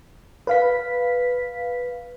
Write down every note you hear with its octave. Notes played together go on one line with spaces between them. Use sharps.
B4 F5 B6